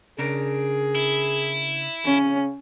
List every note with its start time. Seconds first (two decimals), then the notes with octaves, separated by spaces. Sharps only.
0.18 C#3 D4 G#4 A#4
0.95 E4
2.05 C#3 C#4